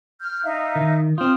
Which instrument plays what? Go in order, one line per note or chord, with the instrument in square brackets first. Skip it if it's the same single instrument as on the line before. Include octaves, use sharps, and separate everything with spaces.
[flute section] F6 G6
D#4 E5 F5
[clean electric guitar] D#3
[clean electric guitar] C4 F4 [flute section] D#6 F6 G6